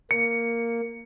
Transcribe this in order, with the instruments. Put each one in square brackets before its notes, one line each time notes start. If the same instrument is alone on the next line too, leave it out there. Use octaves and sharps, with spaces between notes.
[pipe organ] A#3 [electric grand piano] C#7